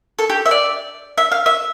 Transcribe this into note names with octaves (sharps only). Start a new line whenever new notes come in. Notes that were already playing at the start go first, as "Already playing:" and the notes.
A4
G4
E5
D5
E5
F5
E5